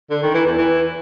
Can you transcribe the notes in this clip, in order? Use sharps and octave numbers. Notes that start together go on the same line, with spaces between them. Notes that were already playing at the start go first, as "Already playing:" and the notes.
D3
D#3
E3
E2
E3